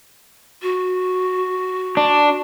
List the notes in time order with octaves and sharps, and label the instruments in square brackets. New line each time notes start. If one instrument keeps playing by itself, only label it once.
[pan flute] F#4
[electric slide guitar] D4